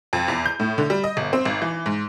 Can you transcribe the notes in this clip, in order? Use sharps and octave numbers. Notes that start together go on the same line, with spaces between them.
F2
E2
G6
A2
D3
G3
D#5
G1
C4
G#1
E3
G#2